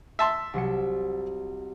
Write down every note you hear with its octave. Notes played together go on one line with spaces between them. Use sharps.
E5 A5 C6
C2 F#3 C#7